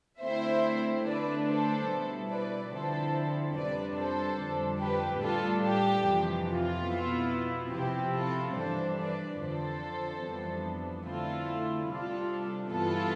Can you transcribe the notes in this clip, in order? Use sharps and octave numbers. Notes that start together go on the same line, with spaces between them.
D3 A3 C4 E4 C5 E5
D3 A3 D4 B4 D5
A4 C5
B2 G3 B3 E4
B4 D5
D3 F3 C4 E4 A4 C5
F2 C3 G3 D4 B4 D5
A4 C5
F2 D3 G3 D4
G4 B4
A2 G3 D4 F4 A4
G4
F2 C3 E3
F4
B2 B3 E4
C3 F3 C4 E4 G4
F4 A4
G2 E3 G3 D4 A4 C5
B4 D5
F2 D3 F3 A4 C5
F2 E3 G3 B3 D4
D3 A3 C4 E4 F4 A4
C3 G3 D4 F4 A4
G2 E3 B3 E4 F4 A4